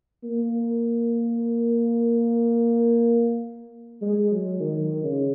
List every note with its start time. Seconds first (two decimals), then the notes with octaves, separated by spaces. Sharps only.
0.23 A#3
4.02 G#3
4.31 F#3
4.60 D#3
5.04 C#3